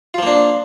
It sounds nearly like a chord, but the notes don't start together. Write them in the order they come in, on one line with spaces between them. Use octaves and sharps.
F4 F3 A#3 D4